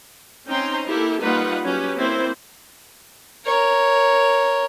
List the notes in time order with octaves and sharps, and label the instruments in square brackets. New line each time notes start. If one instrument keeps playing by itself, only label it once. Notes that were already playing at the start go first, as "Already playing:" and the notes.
[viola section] C4 C#4 D#4 G5 A#5 C6
A#3 E4 G4 A4
G3 A#3 D#4 F4 B4 F#5
F#3 C#4 G4 B4
A#3 C4 E4 C5
[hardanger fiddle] A#4 C#5